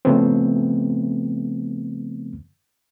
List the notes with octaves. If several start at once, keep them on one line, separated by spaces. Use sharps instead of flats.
C#3 F3 A3 B3 C4